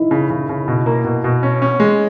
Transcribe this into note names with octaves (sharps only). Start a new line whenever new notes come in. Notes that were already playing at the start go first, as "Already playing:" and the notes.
Already playing: D#4 E4
C#3
C#3
C#3
B2
A#3
B2
B2
C#4
C#4
G#3